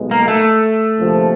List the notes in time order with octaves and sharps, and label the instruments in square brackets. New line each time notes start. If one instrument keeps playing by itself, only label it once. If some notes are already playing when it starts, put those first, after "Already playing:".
Already playing: [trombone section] B1 B2 G#3
[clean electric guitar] A#3
A3
[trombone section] D2 C3 F3 A#3